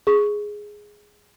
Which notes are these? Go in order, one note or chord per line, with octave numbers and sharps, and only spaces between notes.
G#4 C#6